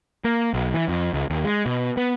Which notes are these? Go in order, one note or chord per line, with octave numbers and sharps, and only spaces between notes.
A#3
B1
E3
F2
C#2
D#2
G#3
B2
B3